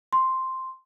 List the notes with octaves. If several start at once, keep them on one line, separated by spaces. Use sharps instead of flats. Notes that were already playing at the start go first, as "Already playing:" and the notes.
C6